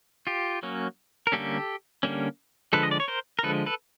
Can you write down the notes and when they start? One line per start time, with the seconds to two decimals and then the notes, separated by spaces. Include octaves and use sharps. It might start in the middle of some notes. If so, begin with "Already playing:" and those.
0.27 F4 G4
0.63 F#3 A#3 C#4
1.27 A#4
1.32 D3 G3 A#3 C#4 G4 A4
2.03 D3 G3 A#3 C#4
2.73 D3 F3 G#3 A4 B4
2.83 D#5
2.91 D5
3.00 C#5
3.08 A#4 C5
3.39 A#4
3.43 D3 F3 G#3 A4 B4
3.66 A4 B4